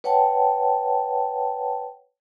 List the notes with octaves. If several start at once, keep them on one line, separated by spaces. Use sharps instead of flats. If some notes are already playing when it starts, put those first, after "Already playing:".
B4 C#5 F#5 G5 A5